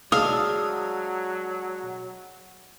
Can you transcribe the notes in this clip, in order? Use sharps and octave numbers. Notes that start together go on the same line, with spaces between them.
F#3 G#3 D4 F5 D#6 E6